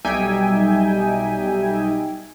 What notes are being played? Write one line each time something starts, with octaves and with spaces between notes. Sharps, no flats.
B1 G3 D#4 E5 G5 G#5